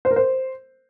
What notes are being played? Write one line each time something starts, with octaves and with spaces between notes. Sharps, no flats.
C5
A#4
C5